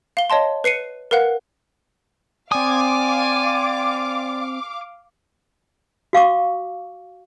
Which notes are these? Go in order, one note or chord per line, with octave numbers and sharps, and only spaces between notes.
F5 G7
C#5 D#5 A5 C6
B4 C7 C#7 D#7
A#4 B4 F5 F#5 F#6
C4 D5 F5 G5 G#5 C6 D6 D#6
F#4 F5 C#6 D6